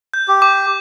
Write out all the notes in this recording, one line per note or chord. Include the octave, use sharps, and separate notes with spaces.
G6
G4
D6